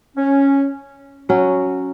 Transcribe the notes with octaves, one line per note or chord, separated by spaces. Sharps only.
C#4
F#3 C#4 F#4